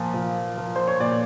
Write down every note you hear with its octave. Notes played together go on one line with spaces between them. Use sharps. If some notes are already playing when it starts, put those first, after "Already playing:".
Already playing: A#2 F3
F3
F3
C5
C#5
A#2 D5